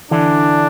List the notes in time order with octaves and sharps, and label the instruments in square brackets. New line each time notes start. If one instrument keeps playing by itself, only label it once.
[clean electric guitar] D3 E3 [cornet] D4